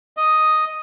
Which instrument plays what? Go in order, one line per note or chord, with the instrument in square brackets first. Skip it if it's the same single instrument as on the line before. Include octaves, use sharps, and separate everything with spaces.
[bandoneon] D#5